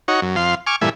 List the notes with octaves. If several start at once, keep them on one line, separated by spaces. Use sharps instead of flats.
D#4 F#4 C#5
F#2
F2 F5 C6
G#5 C#6 D6 F6
G2 A#2 E3 A3 E5 G#5